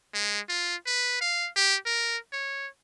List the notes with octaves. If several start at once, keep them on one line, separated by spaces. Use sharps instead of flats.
G#3
F4
B4
F5
G4
A#4
C#5